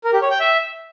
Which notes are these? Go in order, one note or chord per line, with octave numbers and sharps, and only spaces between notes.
A#4
G4
C#5
G5
E5